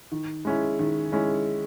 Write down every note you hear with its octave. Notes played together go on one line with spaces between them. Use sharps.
D#3
G#3 C#4 E4
D#3
G#3 C#4 E4